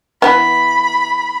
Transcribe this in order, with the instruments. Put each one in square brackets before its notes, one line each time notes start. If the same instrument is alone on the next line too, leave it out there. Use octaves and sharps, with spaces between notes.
[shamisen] E3 G3 B3 [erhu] B5